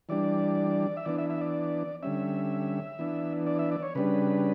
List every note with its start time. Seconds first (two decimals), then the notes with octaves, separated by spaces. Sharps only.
0.09 E3 G3 D4 D5
0.97 E5
1.05 E3 B3 D4 D5
1.18 E5
1.30 E5
1.41 D5
2.03 D3 G3 C#4 E5
2.99 E3 B3 D4
3.47 D5
3.59 E5
3.72 D5
3.83 C#5
3.95 C#3 G3 D4 B4